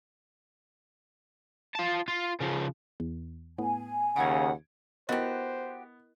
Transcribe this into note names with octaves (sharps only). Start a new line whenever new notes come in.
F4 A5
F4
C#3 F3
E2
A2 B3 G#5
D#2 C#3 F#5 G#6 D7
B3 E4 F#4 G4 A#4 C5 D#5